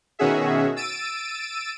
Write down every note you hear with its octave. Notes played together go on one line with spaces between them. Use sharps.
B2 D#3 C#4 F#4 G#4 E5
E6 A6 D7 D#7